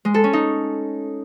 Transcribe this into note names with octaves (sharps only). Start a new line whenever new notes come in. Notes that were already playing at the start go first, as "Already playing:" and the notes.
G#3
A4
C#4
D#4